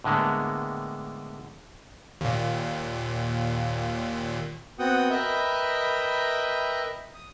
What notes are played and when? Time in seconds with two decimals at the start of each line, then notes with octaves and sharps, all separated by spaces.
0.04 A2 D3 G#3 A#3 B3
2.21 D#2 A#2
4.79 B3 C4 F#4 F#5 G5 D#6
5.10 A#4 B4 D#5 E5 G5 B5
7.14 D#6